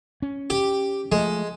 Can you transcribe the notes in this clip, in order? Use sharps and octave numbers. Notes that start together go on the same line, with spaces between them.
C#4
G4
F3 G#3 A3